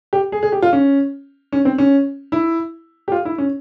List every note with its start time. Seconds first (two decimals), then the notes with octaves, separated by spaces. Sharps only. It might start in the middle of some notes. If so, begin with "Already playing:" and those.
0.13 G4
0.32 G#4
0.43 G#4
0.52 G4
0.62 F4
0.73 C#4
1.52 C#4
1.65 C4
1.78 C#4
2.32 E4
3.08 G4
3.12 F4
3.25 E4
3.38 C#4